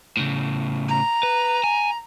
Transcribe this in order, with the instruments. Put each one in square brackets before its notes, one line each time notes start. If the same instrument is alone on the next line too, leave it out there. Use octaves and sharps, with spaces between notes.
[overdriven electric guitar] A2 C#3
[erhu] A#5
[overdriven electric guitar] B4
G#5